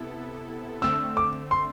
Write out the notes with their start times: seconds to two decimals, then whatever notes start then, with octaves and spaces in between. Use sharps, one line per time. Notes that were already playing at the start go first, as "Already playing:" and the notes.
Already playing: C3 B3 E4 A4
0.82 D3 A3 C4 E6
1.17 D6
1.51 C6